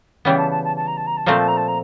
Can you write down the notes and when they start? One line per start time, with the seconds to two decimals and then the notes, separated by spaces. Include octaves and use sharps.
0.25 C#3 E3 G3 B3 G5
0.37 A5
0.50 A5
0.64 A5
0.76 A5
0.87 A#5
0.97 A5
1.06 A#5
1.17 A5
1.26 A#2 F3 A3 C4 A#5
1.37 A5
1.47 A#5
1.57 A5
1.67 A#5